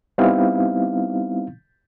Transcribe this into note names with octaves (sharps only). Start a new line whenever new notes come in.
G3 B3 C4 D#4 E4 F5